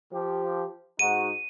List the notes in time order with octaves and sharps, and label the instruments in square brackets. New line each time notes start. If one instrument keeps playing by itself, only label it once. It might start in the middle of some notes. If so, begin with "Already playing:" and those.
[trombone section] F3 G4
[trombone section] G#2 D#4 F#4 [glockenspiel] D#7